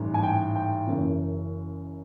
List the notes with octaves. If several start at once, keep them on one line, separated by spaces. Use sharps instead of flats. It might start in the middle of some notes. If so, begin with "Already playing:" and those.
Already playing: A1 G#2 E3 G3
G#5
G5
G5
F#1 F#2 C#3 E3